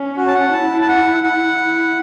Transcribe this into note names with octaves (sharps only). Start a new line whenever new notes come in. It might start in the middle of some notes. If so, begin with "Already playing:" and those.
Already playing: C#4
F#4
A5
F#5
E4 A5
A5
F#5
E4 F#5
E4